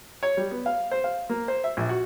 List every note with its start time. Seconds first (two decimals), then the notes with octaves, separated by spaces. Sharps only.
0.23 C#5
0.37 G3
0.51 B3
0.66 F5
0.91 C5
1.04 F5
1.29 A#3
1.48 C5
1.64 E5
1.77 A#1
1.89 F#4